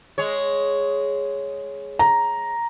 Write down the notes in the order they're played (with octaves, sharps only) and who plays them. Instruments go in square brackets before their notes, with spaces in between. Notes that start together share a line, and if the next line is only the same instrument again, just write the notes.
[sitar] G#3 C#5
[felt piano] A#5